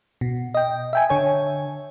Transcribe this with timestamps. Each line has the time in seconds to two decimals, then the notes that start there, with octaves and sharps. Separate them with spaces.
0.21 B2
0.54 D#5 G5
0.93 E5 G5 G#5
1.09 D3 C#5 G#5